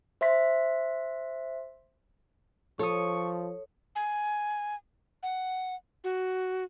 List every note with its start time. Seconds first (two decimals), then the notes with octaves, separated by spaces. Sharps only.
0.21 C5 E5 C6 B6
2.79 F3 A4 C#5 C#6 D#6
3.95 G#5
5.23 F#5
6.04 F#4